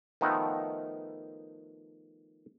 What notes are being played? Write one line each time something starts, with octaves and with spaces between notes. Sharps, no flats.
D#3 F3 A3 B3 D#4